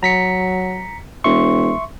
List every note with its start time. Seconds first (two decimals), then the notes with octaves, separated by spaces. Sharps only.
0.03 F#3 A#5 B6 C#7
1.24 E1 E5 C6 C#6